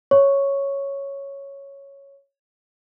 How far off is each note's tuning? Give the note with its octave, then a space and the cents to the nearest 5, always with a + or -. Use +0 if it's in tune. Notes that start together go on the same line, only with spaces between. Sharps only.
C#5 +0 C#6 +0